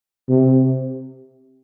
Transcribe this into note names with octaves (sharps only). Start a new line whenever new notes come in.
C3